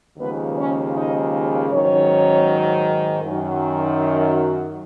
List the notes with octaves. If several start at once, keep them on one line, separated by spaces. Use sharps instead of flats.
D#2 C#3 F3 G#3 B3 B4
C#4 C#5
D#4 D#5
G#2 D#3 F#3 C#4 C#5
F#2 D#3 F#3